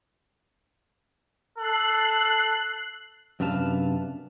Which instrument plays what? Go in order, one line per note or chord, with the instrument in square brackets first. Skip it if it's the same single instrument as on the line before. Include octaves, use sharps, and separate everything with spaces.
[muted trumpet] A4 [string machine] F#6 C7
[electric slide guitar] F#2 C3 D4 B4 F5 A5